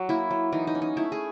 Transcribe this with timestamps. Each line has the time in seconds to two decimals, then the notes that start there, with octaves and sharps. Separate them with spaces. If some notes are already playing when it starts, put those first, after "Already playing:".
Already playing: F#3
0.09 A#3 E4
0.30 F#3
0.52 E3 D#4
0.67 D#4
0.75 C#4
0.82 D#4
0.97 A3 E4
1.12 G#4